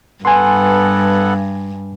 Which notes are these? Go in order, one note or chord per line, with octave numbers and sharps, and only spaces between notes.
G2 B3 A4 F#5 G#5 C6